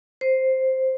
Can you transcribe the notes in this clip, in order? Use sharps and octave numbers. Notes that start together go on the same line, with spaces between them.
C5